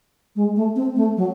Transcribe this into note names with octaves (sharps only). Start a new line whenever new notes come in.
G#3
A3
C4
A3
F#3